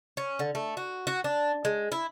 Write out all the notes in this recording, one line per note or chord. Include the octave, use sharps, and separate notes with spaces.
C#4
D3
A3
F#4
F#4
D4
G#3
E4